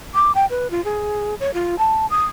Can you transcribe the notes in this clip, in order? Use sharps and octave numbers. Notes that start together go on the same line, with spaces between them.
D6
G5
B4
F4
G#4
C#5
F4
A5
D#6